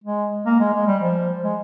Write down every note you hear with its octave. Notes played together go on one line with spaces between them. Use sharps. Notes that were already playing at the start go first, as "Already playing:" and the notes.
G#3
A#3
G#3
G#3
G3
F3
G#3